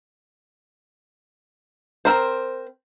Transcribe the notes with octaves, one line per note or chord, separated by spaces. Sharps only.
C4 A#4 C5